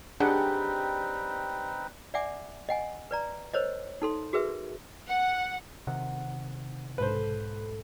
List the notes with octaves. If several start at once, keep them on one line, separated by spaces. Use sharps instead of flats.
G3 C4 D4 D#4 G#4 B4 F#5
D5 E5 F#5 G#5 D6
D#5 F#5 G#5
B4 D5 A#5
A#4 C5 C#5 D#5
D#4 A4 C6
F#4 G#4 A#4 B4 E5
F#5
C3 D#3 F#5
B1 G#2 A4 B4 C5